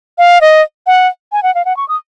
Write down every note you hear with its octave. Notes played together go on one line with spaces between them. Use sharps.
F5
D#5
F#5
G#5
F#5
F5
F#5
C#6
D#6